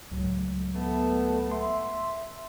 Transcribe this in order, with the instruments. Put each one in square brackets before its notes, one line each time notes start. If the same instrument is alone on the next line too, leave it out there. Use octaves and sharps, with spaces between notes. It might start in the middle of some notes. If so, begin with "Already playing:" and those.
[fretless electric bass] C#2 A2 F#3
[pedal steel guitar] A3 [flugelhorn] B3
[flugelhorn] E5 [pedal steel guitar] C6